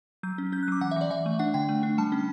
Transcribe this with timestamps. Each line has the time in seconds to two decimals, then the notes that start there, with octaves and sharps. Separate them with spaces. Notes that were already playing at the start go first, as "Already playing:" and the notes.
0.23 F#3 G6
0.38 C#4
0.52 C#4 G6
0.63 F#6
0.68 F#3 D6
0.81 E3 F#5
0.91 E5
0.96 E3 D5
1.10 E3 E5
1.26 A3
1.39 D4 F#5
1.54 D3 G5
1.69 A3
1.83 D4
1.98 G3 A5
2.12 C#4